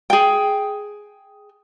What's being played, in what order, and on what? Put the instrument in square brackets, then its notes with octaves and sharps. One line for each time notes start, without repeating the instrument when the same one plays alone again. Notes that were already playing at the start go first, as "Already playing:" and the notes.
[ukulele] G#4 G5